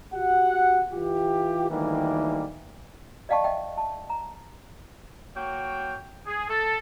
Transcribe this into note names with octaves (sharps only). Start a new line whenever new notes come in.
F#4 G4 F#5
E3 F4 G4
D2 D#3 E3 G3 A#3
D5 D#5 F5 G5 A5 C#6
D#5 E5 G5
A5
A#5
A#3 F#4 C#5 G5
G#4
A4